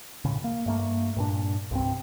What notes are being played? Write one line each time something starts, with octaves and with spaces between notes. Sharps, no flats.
A2 C#3
A#3
G2 A3 A#3
G2 A#2 D4
C2 G2 C4